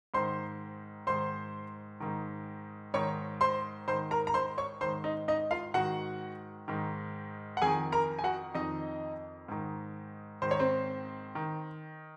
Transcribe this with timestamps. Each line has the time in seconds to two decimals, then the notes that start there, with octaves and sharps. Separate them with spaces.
0.14 G#2 D#3 C5 C6
1.07 G#2 D#3 C5 C6
2.00 G#2 D#3
2.94 G#2 D#3 C#5 C#6
3.41 C5 C6
3.88 G#2 D#3 C5 C6
4.11 A#4 A#5
4.27 A#5
4.34 C5 C6
4.58 C#5 C#6
4.81 G#2 D#3 C5 C6
5.04 D#4 D#5
5.28 D#4 D#5
5.51 F4 F5
5.74 G#2 D#3 F#4 F#5
6.68 G#2 D#3
7.57 F#5
7.62 F2 D#3 G#4 G#5
7.92 A#4 A#5
8.19 G#5
8.24 F#4 F#5
8.54 F2 D#3 D#4 D#5
9.48 G#2 D#3
10.42 G#2 D#3 C5
10.51 C#5
10.59 C4 C5
11.35 D#3